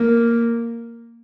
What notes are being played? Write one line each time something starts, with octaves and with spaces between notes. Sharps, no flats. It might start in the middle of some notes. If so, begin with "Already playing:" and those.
Already playing: A#3